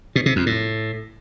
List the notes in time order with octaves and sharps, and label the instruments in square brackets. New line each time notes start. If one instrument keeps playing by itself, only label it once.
[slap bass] B2
C3
F2
A2